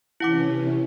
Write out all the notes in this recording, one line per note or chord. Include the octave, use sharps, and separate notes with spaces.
C3 E3 C#4 E4 F#5 D6